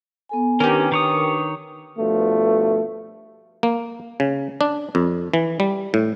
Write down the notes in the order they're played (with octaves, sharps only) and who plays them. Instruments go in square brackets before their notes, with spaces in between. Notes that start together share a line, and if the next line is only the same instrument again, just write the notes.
[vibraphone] B3 A4 G#5
[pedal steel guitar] D#3 C#4 [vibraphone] D4 B4 D6 [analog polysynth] G4 A#4
[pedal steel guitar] D#3 C#5 D#6
[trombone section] G2 B2 F3 A3
[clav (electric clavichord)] A#3
C#3
D4
F2
E3
G3
A2